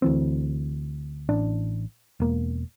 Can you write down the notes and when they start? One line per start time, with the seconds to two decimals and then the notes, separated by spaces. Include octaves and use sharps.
0.02 D2 E3 C4
1.29 A1 D4
2.20 E1 A#3